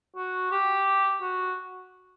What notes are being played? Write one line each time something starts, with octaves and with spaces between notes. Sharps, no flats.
F#4
G4
F#4